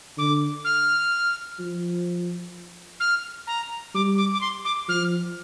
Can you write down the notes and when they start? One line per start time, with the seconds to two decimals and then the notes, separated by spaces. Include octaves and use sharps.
0.18 D3 D6
0.65 F6
1.60 F3
3.00 F6
3.47 A#5
3.95 G3 D6
4.18 D6
4.33 D6
4.41 C6
4.65 D6
4.89 F3 F6